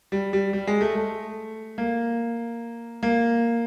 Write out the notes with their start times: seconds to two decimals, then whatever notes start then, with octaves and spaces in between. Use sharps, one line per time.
0.12 G3
0.33 G3
0.53 G3
0.67 G#3
0.81 A3
0.95 A3
1.78 A#3
3.03 A#3